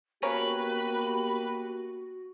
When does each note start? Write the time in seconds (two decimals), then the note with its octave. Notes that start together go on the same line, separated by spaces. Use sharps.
0.23 C#3 A#3 B3 F#4 G4 A#4 B4 C#5